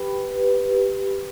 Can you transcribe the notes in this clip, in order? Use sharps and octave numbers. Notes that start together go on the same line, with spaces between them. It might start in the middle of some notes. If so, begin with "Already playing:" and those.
Already playing: G4 B4